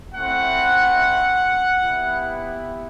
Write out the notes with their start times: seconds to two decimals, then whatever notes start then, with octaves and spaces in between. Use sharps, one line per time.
0.15 A3 C4 E4 F#5
1.78 B3 E4 G4